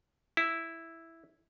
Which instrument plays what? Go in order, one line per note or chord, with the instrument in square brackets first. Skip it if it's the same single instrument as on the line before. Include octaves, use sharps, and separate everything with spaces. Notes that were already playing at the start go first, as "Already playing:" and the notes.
[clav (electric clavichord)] E4